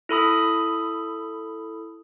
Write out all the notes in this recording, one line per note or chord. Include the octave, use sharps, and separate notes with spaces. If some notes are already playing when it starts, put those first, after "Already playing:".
E4 A4 B5 D#6